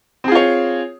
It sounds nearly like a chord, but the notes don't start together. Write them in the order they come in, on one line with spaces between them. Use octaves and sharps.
C4 G#4 F4 C#5